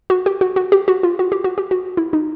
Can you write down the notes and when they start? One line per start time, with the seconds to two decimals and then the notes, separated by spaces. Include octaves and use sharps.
0.10 F#4
0.26 G4
0.41 F#4
0.56 F#4
0.72 G4
0.88 F#4
1.03 F4
1.19 F#4
1.32 G4
1.44 F#4
1.58 G4
1.71 F#4
1.97 E4
2.13 D#4